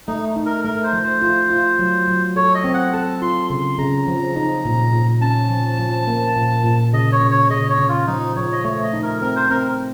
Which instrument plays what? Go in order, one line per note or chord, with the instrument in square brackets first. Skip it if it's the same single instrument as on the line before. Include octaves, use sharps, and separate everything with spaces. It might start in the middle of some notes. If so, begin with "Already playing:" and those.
[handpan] A3 [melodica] D#4
[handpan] D#4
[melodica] A#4
[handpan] A3 [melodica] A#4
[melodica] C5
[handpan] F3
[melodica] C5
[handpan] F4
F4
F#3
F#3
[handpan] A4 [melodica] C#5
[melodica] D#5
[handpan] C4
[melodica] F#5
[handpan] A4 [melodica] A5
[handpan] F4 [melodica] C6
[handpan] C#3 [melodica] C6
[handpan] C#3 [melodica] A#5
[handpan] F3
D#4
A#2
A#2
[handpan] C#4 [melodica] A5
[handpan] F3
F3
A#3
A#2
A#2
[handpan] C#3 [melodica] D#5
[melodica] C#5
[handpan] C#3
[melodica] C#5
[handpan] C#3 [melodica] D#5
[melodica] C#5
[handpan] C#3
[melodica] F4
[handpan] F3 [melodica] D#4
[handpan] F3 [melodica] C#5
[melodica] D#5
[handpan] A3 [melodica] C#5
[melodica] D#5
[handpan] D#4
[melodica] A#4
[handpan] C4 [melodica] A#4
[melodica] C5
[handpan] C4 [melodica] A#4